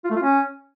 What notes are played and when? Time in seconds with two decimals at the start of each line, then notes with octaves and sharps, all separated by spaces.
0.04 F4
0.10 A3
0.16 F4
0.22 C#4